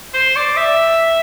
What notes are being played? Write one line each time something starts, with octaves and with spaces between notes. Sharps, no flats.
C5
D5
E5